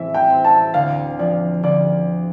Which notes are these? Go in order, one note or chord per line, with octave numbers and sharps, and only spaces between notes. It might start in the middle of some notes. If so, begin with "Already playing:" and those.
Already playing: A2 E3 C4 E5
G5
C4
A5
D2 F5
F3 D5
D2 D5